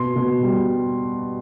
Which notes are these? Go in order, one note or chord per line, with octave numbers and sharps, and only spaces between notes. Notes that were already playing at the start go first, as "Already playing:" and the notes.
Already playing: B2 C6
B2
G3